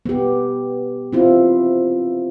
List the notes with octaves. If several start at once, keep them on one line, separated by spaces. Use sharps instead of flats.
B3 G4
C4 E4 F4